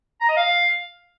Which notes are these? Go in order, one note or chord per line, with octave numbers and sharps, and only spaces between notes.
A#5
D#5
F5